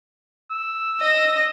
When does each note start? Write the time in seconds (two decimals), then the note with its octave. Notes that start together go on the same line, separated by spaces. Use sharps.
0.51 E6
0.99 D#5 A#6